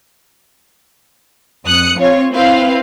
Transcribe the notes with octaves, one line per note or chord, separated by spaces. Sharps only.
F2 D#6 F#6 C#7
C4 F4 C#5
C4 E4 B4 F5